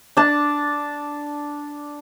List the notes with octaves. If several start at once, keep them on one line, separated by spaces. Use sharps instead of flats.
D4 A5